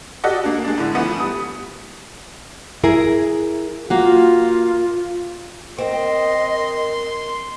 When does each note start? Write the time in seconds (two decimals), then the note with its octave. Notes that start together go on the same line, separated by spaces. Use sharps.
0.24 F#4 G4 A4 D5 D#5 F#5
0.44 A#3 D4
0.65 G#3 D4
0.78 A2 D3
0.95 E3 F3 A3 B3
1.20 G3 D#6
2.84 E4 G#4 A#4
3.90 A#3 F4 F#4
5.78 C4 A#4 D#5 C6